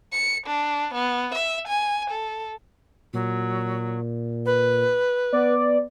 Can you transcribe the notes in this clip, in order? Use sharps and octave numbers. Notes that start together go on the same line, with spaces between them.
C#7
D4
B3
E5
G#5
A4
A#2 F#3
B4
B3 D5